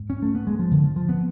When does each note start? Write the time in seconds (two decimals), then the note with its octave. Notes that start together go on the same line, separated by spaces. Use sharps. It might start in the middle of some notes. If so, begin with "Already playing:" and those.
Already playing: G#2
0.10 C#4
0.22 A3
0.35 B3
0.47 G#3
0.59 F3
0.71 D3
0.84 F3
0.96 F3
1.09 B3